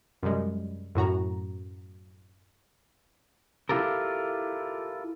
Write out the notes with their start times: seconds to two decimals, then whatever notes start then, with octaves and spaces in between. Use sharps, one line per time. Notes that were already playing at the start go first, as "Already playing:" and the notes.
0.23 F#2 C3 G3 G#3
0.95 F#2 A2 F#4 A#5
3.69 E4 F4 G4 A4 A#4